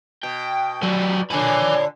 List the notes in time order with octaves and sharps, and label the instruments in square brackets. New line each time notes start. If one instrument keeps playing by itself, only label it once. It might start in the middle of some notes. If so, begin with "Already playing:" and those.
[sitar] B2 [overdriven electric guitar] G5
[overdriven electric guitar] F#3 G3 [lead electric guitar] F#4 D5
[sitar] A#2 D3 [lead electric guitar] B4 G#5 [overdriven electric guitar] C#5 B5